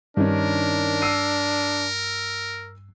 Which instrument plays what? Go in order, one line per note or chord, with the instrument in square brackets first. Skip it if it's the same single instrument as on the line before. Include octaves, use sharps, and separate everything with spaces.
[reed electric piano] G2 [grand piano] D#3 C#4 [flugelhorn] D4 [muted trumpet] A#4
[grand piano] E6 C7 D#7